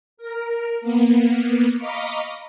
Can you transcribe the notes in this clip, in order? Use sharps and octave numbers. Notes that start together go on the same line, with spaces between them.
A#4
A#3 B3
D#5 F5 A#5 B5 C#6 D6